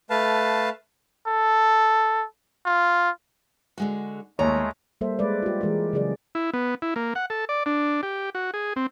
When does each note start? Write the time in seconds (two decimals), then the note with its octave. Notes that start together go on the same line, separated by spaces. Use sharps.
0.10 A3 B4 F5 A5
1.27 A4
2.65 F4
3.78 D3 G#3 F#4
4.39 D#2 G#3 A3 C#5 A#5
5.01 G3 A#3 A4 C5 E5
5.19 G#3 B4 D5
5.42 F4 G4
5.61 E3 G#3 G4 A#4
5.93 C#3 F#3 G#4 D5
6.35 E4
6.53 B3
6.82 E4
6.96 A#3
7.15 F#5
7.30 A4
7.49 D5
7.66 D4
8.03 G4
8.35 F#4
8.54 G#4
8.76 C4